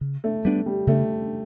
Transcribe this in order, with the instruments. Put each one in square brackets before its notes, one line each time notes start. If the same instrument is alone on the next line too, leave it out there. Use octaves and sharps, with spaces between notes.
[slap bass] C#3
[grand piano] A3
[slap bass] G3 B3 D4
[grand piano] G3
[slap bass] C#3 [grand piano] A3